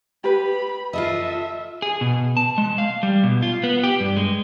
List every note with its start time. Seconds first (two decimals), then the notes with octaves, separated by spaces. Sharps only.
0.24 G4 B4 B5
0.93 F4 A4 D#5 E5
1.82 G#4
2.01 B2
2.37 A5
2.58 G#3
2.78 F5
3.03 G3
3.23 B2
3.43 F4
3.63 B3
3.84 G4
4.00 G2
4.17 G#3